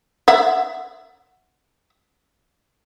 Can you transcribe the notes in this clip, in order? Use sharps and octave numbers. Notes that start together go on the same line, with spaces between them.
E5 F#5